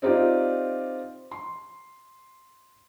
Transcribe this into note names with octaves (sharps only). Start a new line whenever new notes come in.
C4 D#4 F4 G4 D5
C6